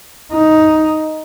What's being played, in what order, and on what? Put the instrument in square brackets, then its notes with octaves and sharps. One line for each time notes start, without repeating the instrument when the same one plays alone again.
[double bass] D#4